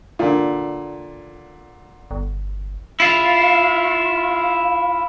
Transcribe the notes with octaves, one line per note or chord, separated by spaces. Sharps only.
A#2 D3
G1
E4 F4